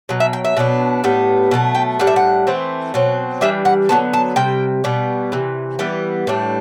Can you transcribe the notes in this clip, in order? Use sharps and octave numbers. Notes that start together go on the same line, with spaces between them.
B2 F#3
E5
G5
E5
B2 F#3 B3 D4
A2 G3 B3
B2 F#3 A3
G5
A2 G3 D4 F#5
E5
F#5
E3 A3 C4
B2 F#3 C4
E3 G3 D4 E5
F#5
D3 F#3 B3 A5
A5
C3 G3 G5
B2 G3 B3
C3 E3
E3 G3 B3
A2 E3 G3 D4